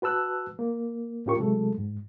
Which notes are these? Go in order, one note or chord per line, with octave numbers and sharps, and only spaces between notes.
F#4 B4 A5 E6 F#6
A#3
A2 C#4 F4 G4 A#4 C#6
C3 F#3 G#3 A3 A4
G#2